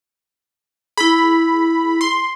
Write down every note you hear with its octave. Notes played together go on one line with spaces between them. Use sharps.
E4 G#4 B5
C6